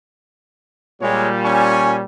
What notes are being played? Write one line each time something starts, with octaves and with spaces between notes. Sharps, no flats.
A#2 G3 G#3 C#5
C#4 G#5 C#6